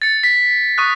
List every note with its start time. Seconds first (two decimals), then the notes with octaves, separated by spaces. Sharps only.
0.02 A6 C#7
0.23 B6
0.78 C#6 D#6 F#6